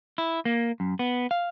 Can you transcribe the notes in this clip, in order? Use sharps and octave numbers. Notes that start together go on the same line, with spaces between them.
E4
A#3
F#2
B3
F5